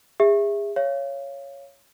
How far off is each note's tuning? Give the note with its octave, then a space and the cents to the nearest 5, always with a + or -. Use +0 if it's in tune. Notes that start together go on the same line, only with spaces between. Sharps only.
G#4 -30 E5 +0
C#5 +0 F5 -25